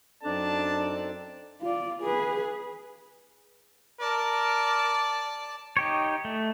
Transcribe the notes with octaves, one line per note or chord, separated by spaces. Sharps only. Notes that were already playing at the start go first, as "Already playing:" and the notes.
F#2 C4 D4 D#4 A4 D5 A5
F4 D5
G#4 B4
A#4 D5 A5
D#4 G4 C#5
A3